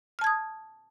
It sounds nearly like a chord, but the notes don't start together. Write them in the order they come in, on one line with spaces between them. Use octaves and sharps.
F6 A5 G#6 D#6